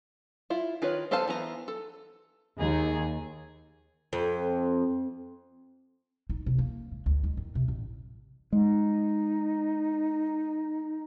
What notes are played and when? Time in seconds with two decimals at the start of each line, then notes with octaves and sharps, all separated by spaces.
0.50 E4 F4
0.82 D#3 F4 B4 C#5
1.11 B3 A4 C5 F5 A5
1.27 E3 B3 G#4 A#5
1.68 A4
2.60 D#2 G#4
4.13 F2
6.29 D#4
6.46 C3
6.58 A#3
6.92 G#3
7.06 D2
7.24 G#3
7.37 D#3
7.55 C3
7.68 A1
8.52 G#3 D#4